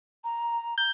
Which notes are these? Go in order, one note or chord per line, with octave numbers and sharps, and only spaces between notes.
A#5
G6